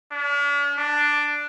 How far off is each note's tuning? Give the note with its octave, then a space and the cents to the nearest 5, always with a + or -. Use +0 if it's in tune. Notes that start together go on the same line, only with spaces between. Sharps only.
D4 -45
D4 +5